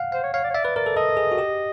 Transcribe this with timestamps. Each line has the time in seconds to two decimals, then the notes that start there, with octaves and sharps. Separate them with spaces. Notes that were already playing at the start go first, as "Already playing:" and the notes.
Already playing: F5 F#5
0.12 C5 F5
0.23 C#5
0.34 C#5 F5
0.44 D5
0.50 C#5
0.54 D5 E5
0.65 B4
0.76 A#4 D5
0.86 A4
0.96 A4 D#5
1.17 G#4
1.32 F#4
1.38 G4